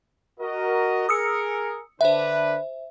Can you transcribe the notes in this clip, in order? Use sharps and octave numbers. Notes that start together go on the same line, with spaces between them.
F#4 A#4 D#5
G#4 A#4 D#6 E6 C#7
D3 D4 B4 C5 E5